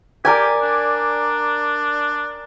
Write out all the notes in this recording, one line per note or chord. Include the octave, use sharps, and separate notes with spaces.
G4 A#4 D5 G#5
D4